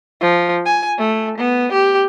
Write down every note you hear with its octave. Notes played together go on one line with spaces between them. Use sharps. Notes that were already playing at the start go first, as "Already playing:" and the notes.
F3
G#5
A3
B3
G4